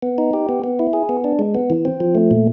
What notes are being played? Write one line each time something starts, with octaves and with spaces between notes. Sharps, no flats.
B3
D#4
G4
B3
B3
E4
G#4
B3
D4
G#3
B3
E3
C4
F3
A3
A#2